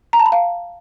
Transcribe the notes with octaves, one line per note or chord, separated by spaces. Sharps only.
A#5
A5
B5
F5